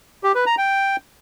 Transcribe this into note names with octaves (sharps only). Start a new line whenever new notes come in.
G4
B4
A#5
G5